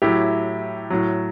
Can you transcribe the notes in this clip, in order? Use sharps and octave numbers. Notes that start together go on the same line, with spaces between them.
A2 F#3 E4 G4
A2 F#3